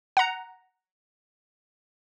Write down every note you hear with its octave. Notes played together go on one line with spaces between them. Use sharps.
F#5 A#5